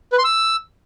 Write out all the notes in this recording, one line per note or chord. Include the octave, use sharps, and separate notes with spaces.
B4
C6
E6